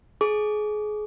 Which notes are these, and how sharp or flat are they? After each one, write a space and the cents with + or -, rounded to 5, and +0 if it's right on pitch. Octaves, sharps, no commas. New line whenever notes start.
G#4 +25 D6 -40